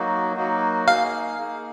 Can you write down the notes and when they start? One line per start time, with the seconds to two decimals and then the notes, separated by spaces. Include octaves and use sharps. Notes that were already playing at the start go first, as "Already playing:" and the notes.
Already playing: F#3 A#3 D#4 F#4
0.36 F#3 A#3 D#4 F#4
0.88 A#3 D#4 G#4 F5
1.39 A#3 D#4 G#4